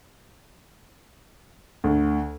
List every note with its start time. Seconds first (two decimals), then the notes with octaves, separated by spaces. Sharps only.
1.84 D2